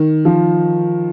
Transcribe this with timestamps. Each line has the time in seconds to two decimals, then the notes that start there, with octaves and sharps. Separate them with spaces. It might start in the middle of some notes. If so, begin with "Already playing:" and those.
Already playing: D#3
0.25 F3